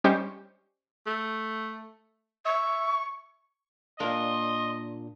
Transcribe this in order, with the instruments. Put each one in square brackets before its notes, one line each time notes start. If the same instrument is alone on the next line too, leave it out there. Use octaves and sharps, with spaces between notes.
[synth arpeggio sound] G3 C#4 G4 C5 D#5 C#6
[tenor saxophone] A3
[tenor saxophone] E5 [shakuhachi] C#6
[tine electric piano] A#2 D4 [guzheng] A#3 [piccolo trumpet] D#5 [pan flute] C6